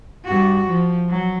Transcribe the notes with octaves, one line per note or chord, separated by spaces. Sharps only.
G2 F#4
F3
F#3